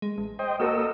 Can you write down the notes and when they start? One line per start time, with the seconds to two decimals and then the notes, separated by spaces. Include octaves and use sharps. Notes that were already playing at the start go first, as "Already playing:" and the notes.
0.02 G#3
0.18 A1
0.39 C5 D#5 G5
0.60 A#3 F#4 A4 A#4 D#5 E6